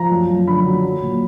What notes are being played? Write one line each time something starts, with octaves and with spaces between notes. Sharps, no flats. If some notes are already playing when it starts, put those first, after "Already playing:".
Already playing: F3 A#5
F#2
F#2
D3 B5
F#3
F#3
A#2